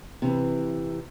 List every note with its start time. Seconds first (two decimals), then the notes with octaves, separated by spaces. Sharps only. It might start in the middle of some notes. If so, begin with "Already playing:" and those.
0.22 C3 E3